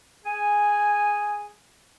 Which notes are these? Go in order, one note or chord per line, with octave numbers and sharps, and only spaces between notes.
G#4 G#5